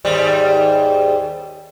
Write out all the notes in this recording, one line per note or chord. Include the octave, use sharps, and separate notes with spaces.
D#2 G#2 G3